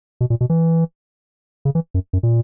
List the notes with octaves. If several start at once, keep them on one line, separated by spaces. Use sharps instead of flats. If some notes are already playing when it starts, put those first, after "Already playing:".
B2
A#2
B2
E3
C#3
E3
F#2
F#2
A#2